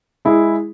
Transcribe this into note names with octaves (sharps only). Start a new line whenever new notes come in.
G#3 E4 G#4